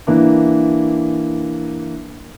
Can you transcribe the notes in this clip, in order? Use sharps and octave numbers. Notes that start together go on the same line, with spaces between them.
E3 A#3 D4